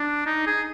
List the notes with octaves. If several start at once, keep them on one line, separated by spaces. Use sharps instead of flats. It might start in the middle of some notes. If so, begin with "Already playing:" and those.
Already playing: D4
D#4
G#4